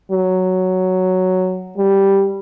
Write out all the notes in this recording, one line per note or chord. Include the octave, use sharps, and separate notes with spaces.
F#3
G3